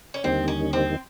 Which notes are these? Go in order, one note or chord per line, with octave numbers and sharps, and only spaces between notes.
C#4
D#2 D3 G3 A#3 C4 D#4
C#4
C4